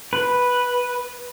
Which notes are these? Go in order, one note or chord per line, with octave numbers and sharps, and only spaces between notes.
B4